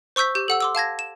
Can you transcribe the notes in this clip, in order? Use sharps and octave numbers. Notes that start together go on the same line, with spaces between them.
C5 C#6 E6 G6 B6
G4 G6
A4 F#5 E6
C6 D6 E6
F5 A5 G#6 A#6
E7